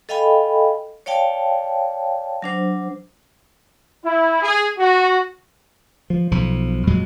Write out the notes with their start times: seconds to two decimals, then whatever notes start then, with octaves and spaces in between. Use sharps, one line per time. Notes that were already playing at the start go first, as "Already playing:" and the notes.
0.09 A4 D#5 F5 G5 G#5 B5
1.06 C#5 D5 F5 G5 A5
2.42 F#3 D4 C5
4.03 E4
4.42 G#4
4.78 F#4
6.10 F3
6.31 B1 F3
6.87 F2 A#2 F#3 G#3